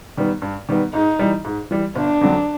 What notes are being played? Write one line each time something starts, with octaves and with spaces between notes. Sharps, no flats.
D#3 G3 B3
G2
D#3 G3 B3
G#2 D#4
E3 G3
G#2
E3 G3
G1 D4
F2 D3 F#3